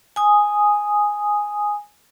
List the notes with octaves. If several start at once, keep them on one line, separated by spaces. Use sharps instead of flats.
G#5 D#6